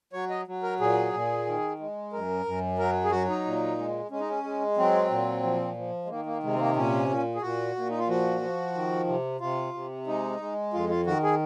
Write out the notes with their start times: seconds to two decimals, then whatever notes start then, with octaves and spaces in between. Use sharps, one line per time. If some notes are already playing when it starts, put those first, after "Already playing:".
0.13 F#3 C#5
0.30 D#5
0.47 F#3
0.63 A#4
0.80 A#2 G#4
1.13 A#2
1.46 D#3
1.79 G#3
2.13 F#2 A#4
2.46 F#2
2.79 F#3 A#4
3.04 G#4
3.11 F#3 F#4
3.28 D#4
3.45 A#2
3.78 G#3
4.11 G#3 C#4
4.20 D#4
4.29 C#4
4.44 G#3
4.77 F#3 C4
5.10 A#2
5.43 F3
5.77 F3
6.05 G#3
6.09 D#3 A#3
6.26 A#3
6.43 C3 G#3
6.54 C4
6.59 A#3
6.76 A#2 C#4
7.09 A#2
7.35 G#4
7.42 A#2 F#4
7.76 A#2
7.90 D#4
7.99 F4
8.08 F3 F#4
8.41 F3
8.74 D#3
9.07 C3
9.40 C3 F4
9.74 C3
10.07 G#3 D#4
10.40 G#3
10.73 F2 F4
10.90 F4
11.06 D#3 F#4
11.23 G#4